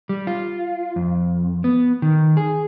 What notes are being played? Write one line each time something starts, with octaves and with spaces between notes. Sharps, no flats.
G3
F4
F2
B3
D#3
G#4